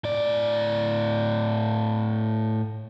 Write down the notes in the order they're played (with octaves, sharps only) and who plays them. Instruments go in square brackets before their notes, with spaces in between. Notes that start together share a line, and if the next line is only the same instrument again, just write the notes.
[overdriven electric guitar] A2 D5